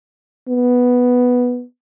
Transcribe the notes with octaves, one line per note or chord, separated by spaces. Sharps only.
B3